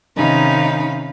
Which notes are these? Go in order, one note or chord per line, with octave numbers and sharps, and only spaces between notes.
C3 D#3 C#4 D#4 F5 B5